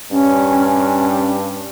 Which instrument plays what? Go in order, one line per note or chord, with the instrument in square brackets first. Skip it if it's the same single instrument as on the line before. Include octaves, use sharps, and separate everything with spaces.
[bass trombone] G2 [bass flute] C#4